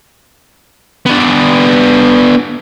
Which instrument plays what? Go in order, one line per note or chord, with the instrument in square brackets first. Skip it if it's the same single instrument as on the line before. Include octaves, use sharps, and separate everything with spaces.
[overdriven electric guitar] B3 D4